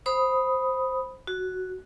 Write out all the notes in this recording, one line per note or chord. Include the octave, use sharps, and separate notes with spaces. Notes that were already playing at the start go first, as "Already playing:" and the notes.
C5 B5 D#6
F#4